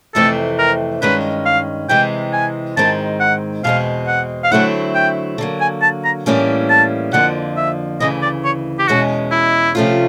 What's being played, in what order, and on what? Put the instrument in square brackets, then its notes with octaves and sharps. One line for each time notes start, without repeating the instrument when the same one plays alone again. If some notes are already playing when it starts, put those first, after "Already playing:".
[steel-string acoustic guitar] F2 C3 E3 A3 C4 [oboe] A4
[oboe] A#4
[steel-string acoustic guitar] G2 D#3 G#3 C#4 [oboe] B4
[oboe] F5
[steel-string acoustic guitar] C3 E3 G#3 C4 [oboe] G5
[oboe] G#5
[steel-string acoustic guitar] G#2 D#3 G#3 C4 [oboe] A5
[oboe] F#5
[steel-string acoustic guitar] E2 B2 G#3 C4 [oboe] F5
[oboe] F#5
F5
[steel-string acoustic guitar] D3 F#3 A3 C4 E4 [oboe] F#5
[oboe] G5
[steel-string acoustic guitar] D3 F#3 A#3
[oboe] G#5
A5
A#5
[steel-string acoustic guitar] A2 E3 G3 A#3 C#4
[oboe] A5
[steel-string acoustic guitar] F2 D3 F3 A#3 [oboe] F#5
[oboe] E5
[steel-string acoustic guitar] D2 C#3 E3 [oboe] D#5
[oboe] D5
C#5
G4
[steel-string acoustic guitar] E2 B2 G#3 C#4 [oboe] F#4
[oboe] E4
[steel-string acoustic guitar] C3 F3 A3 C#4 F4